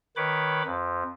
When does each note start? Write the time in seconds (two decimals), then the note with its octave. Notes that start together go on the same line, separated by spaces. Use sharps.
0.16 D#3 B4 C#5 B5 D6
0.65 F2